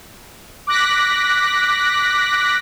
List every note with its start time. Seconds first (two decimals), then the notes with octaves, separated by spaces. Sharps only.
0.67 D6 F#6 A#6 B6